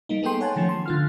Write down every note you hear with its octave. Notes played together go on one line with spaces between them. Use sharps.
G3 A#3 D#4
B3 G#4 A4 G5 C6
C#5 F#5 G#5 A5
D#3 F3 A3 C#4
C6
D3 F4 F6